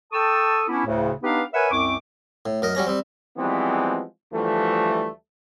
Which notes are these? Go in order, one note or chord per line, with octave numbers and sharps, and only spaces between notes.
A4 G5 A5 C#6 D#6 E6
B3 C#4 D4 E4
D2 A2 C#3
B3 D4 D#4 G4 B4 F5
A#4 B4 C#5 E5 F#5 G#5
C2 F#2 C4 C#6 D6
A2
F#2 A#4 D#5
F#3 G3 C#4 A#5
G3 C4
E3 F3 G3 G#3 B3 C4
D2 E3 F3 G3 A3